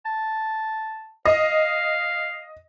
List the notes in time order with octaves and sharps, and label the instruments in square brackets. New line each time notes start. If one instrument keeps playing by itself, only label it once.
[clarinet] A5
[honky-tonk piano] D#5 [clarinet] F5